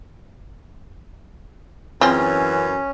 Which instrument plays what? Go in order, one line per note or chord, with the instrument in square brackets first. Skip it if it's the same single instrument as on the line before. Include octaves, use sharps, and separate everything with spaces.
[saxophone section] F#2 E3 [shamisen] C4 F4 G#4 [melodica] C#4